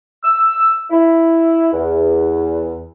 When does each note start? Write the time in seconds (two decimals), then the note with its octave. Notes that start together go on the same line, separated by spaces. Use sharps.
0.23 E6
0.90 E4
1.72 E2